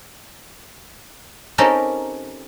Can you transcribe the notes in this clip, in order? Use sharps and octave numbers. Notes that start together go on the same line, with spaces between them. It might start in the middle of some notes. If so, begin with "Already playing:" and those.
C4 C#4 D#4 G4 A4 A#4